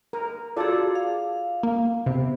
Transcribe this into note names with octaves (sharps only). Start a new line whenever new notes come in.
A#4
F4 F#4 G#4 A4 D5
F5
A#3
C3 B3